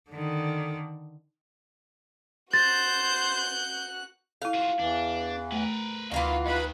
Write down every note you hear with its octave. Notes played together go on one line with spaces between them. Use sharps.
D3 D#3
F#4 C5 F#6 G6 A6
E4 A4 F5
F4 F#4
E2 E3 D4
A3 A#4 B4
D2 D#3 E3 F4 F#4 F5
D#2 D#3 B4 D#5 B5